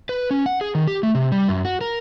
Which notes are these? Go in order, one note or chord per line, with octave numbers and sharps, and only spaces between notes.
B4
C#4
F#5
G#4
D#3
G4
A3
C3
G3
F#2
F#4
A#4